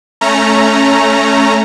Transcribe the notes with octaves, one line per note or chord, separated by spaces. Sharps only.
A3 C#4 A#5